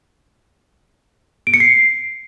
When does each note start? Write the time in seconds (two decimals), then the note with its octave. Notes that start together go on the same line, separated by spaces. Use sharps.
1.47 D7
1.54 C#7
1.60 C7